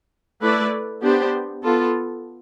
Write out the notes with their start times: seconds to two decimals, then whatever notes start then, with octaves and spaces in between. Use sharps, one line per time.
0.42 A3 E4 B4 D5
1.03 B3 D4 G4 C5
1.63 B3 F4 A4